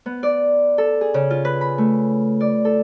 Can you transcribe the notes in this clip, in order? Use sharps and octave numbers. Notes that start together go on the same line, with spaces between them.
B3
D5
A4
G#4
C#3
F4
B4
B5
A3
D5
A4